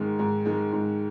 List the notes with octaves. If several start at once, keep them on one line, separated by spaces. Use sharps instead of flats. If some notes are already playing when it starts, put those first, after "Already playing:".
Already playing: G#2 D#3 G#3
G#2
D#3 G#3
G#2